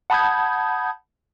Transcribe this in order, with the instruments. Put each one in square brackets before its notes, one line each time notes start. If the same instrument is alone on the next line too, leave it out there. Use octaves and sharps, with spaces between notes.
[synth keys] F#5 A5 B5 D#6 G6 G#6